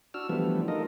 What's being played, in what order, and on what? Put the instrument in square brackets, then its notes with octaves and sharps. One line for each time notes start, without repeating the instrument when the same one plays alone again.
[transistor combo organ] D4 F#4 E6 F6
E3 F3 G3 A3 B3 D4
D#4 F4 A4 A#4 D#5